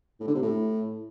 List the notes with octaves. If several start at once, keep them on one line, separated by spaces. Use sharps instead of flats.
A2
D3
C3
A2